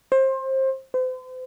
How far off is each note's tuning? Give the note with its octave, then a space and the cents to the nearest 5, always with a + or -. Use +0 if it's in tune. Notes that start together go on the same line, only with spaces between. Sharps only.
C5 +25
C5 -40